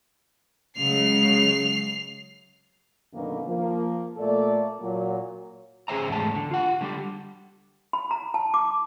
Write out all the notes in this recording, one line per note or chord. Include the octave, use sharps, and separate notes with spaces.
C#3 F#3 G#3 C7 F7
F#2 B2 D3 D#3 A#3 B3
F3 A#3
A#2 A3 A#3 A4 D5
A#2 F#3
C#4 G#4 B4 C5 E5 A#5
E2 G#2 A3 A5
D3
F4 F#5
D3 G3 G4
B5
A#5
A5
D6